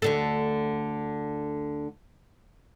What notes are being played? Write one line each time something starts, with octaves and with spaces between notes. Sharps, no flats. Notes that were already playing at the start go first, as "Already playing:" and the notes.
D2 D3 A4